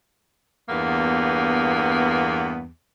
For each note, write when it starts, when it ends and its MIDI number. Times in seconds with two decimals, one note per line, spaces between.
0.69 2.67 40
0.69 2.67 43
0.69 2.67 58
0.69 2.67 59